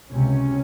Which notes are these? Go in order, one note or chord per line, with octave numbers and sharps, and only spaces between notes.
C#2 C3 C#4